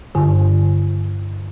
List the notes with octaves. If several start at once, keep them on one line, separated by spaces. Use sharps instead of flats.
G2 D3